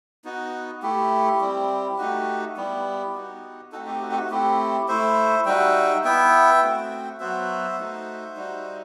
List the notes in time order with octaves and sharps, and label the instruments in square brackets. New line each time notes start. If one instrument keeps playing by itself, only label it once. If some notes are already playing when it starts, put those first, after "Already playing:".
[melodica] B3 D#4 F#4
A3 E4 G4
G3 C4 E4
A3 D#4 F#4
G3 B3 E4 G4
B3 D#4 F#4
A3 C4 D#4 F#4 A4
G4
F#4
G4
F#4
A3 C4 E4 G4
A3 E4 C5 E5
G3 D#4 F#4 E5 G5
B3 E4 E5 G5
A3 C4 F#4
F#3 B3 F#4 C5 E5
A3 D#4 F#4
G3 D#4 F#4